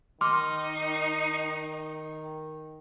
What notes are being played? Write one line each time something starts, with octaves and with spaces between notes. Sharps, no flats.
D#3 D#4 C6 D6 F6